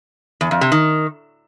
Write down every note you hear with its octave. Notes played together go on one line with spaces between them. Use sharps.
E2
F2
C3
D#3